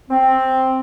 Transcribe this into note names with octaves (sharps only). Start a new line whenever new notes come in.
C4